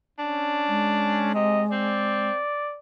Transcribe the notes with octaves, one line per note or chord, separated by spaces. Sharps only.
C#4 D4
G#3
C3 D#5
C4 D5